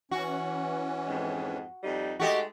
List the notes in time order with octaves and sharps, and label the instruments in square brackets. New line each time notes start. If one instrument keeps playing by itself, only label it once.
[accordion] E3 C#4 [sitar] F#4
[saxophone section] F2 G#2 G#3
F2 G3 D#4
[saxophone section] G#3 A3 D#4 [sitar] F#4 G4 D#5